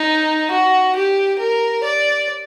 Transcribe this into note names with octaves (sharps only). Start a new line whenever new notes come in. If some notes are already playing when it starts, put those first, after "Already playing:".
Already playing: D#4
F#4
G4
A#4
D5